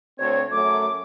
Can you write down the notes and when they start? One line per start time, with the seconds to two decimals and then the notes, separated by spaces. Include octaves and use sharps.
0.19 D2 C4 C#5 G#6
0.51 F#2 A3 D6